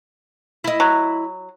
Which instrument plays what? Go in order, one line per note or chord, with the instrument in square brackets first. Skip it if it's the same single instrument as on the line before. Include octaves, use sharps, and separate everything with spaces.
[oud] E4 D#5
[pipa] F#3